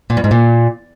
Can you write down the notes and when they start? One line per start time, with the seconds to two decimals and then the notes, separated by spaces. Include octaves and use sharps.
0.10 A#2
0.17 G2
0.24 G#2
0.31 A#2